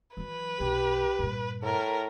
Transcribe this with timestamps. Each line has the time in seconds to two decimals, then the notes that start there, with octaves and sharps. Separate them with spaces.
0.17 E3 F#3 B4
0.60 B1 F2 G4
1.19 G2 A#2
1.63 A2 A#4